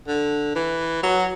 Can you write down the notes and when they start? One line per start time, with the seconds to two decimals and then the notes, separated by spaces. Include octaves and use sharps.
0.08 D3
0.55 E3
1.03 F#3